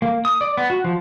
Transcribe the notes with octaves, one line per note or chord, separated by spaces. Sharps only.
A#3
D#6
D5
B3
F#4
F3